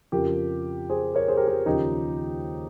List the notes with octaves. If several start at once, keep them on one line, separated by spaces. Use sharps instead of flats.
F2 C#3 F3 G4 A#4
G#4 C5
A#4 C#5
G#4 C5
G4 A#4
G4 A#4
D#2 C#3 F3 D#4 G4